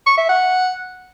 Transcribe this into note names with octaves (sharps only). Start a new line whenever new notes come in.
C#6
E5
F#5